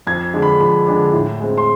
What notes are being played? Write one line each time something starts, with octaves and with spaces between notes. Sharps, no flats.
F2 G#6
D3 G#3 D4
B5
F2 B5
D3 G#3 D4
A2
G#3 C4
C6